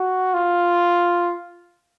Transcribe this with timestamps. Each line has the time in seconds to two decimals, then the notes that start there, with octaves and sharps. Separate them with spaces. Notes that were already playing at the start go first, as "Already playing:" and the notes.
Already playing: F#4
0.34 F4